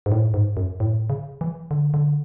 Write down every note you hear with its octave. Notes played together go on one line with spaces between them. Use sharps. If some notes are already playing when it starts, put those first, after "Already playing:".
G#2
A2
G#2
F#2
A2
C#3
E3
D3
D3